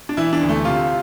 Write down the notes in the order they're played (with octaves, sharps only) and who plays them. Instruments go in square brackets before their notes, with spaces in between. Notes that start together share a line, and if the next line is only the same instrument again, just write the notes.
[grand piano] D4
E3 E4
D4
D2
A3
C3 F4